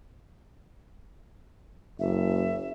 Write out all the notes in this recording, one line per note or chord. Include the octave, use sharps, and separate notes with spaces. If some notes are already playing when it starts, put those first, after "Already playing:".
F#1 E5